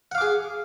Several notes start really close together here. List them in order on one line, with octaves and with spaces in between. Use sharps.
F#5 F5 D6 G#4